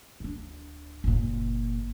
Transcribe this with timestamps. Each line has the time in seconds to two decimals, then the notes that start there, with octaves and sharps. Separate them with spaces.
0.20 D1 D4
1.04 F#1 A#2